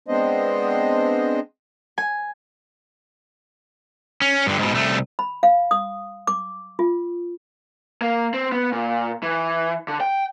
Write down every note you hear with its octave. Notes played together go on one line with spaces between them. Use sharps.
G#3 B3 C4 D4 C5 D#5
G#5
C#4
G2 D3
G#2 B2
C2 A3
B5
F5
D#6
D6
F4
A#3
C4
B3
A#2
E3
D3
G5